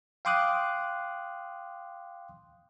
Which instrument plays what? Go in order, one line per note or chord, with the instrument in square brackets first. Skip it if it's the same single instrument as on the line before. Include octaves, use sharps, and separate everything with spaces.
[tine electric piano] F5 G5 C6 D6 D#6 F#6